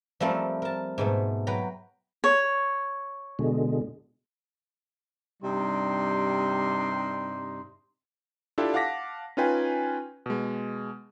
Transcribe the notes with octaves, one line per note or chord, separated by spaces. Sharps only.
F3 G3 A3 C4 A#4
A#4 A5
G#2 B2 A3
F#3 B4 G5 A#5
C#5
B2 D3 G#3
G2 C3 G3 D4 D#4 C6
D4 E4 F4 G4 A4
F5 F#5 A5 D6 A#6 B6
C#4 D#4 F4 B4 G5 G#5
B2 G#3